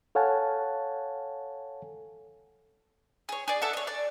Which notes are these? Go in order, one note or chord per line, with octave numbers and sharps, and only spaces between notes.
A4 C#5 F5 F#5 G#5 A5
G#4 C#5
G#4 D5
A4 E5 F#5
C#5 D#5
D5